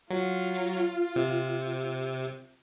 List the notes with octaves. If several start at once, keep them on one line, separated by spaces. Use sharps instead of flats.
F#3 F4
C3